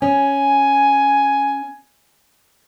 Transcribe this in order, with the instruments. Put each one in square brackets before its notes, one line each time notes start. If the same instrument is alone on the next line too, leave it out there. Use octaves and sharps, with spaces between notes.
[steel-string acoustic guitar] C#4 [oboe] G#5